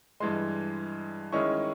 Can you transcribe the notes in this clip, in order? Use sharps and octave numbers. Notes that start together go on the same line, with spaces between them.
G2 E3 G#3 C6
D#3 G#3 C#4 E4 C#6